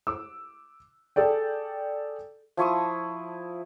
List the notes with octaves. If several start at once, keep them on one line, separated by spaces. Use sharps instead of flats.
D6 E6
G#4 A4 D5 G5
F3 E4 C#6 D#6